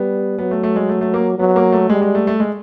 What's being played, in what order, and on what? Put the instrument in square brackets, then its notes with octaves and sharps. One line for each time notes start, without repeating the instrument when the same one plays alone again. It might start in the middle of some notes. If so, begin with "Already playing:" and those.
Already playing: [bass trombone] G3 [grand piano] B3
[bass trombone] F#3 [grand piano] B3
[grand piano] A3
A3
G#3
A3
A3
A#3
[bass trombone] F#3 [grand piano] B3
[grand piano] A#3
A3
[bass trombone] G3 [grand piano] G#3
[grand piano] G#3
A3
A3
G#3